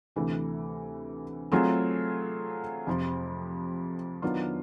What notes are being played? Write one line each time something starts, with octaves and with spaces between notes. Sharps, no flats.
D2 C3 E3 A3
F#3 A3 C4 F4 G#4
F2 C3 F3
D#3 F#3 B3 D4 F4